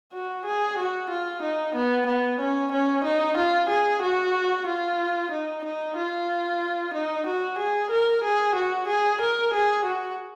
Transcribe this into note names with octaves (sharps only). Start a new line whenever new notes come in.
F#4
G#4
F#4
F4
D#4
B3
B3
C#4
C#4
D#4
F4
G#4
F#4
F4
D#4
D#4
F4
D#4
F#4
G#4
A#4
G#4
F#4
G#4
A#4
G#4
F#4